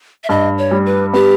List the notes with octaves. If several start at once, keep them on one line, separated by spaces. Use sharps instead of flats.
E5
G2 D#5
C#5
G3
B4
B3 G4